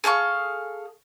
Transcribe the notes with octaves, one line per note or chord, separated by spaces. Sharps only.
G#4 A4 F5 C#6